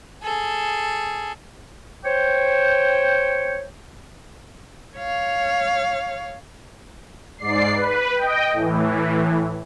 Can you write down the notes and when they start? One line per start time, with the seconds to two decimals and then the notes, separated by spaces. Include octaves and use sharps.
0.24 G#4 A4
2.04 C5 C#5 G5
4.98 C#5 F5
7.38 G#2 D5 C7
7.74 B4
8.15 D#5 G5
8.52 A2 E3